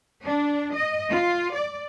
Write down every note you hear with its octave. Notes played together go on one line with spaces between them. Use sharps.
D4
D#5
F4
D5